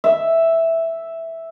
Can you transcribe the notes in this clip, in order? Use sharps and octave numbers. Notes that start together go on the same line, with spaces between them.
E5